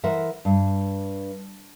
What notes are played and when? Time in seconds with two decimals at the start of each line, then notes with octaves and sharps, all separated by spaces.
0.04 E3 A#4 C5 E5 F#5
0.45 G2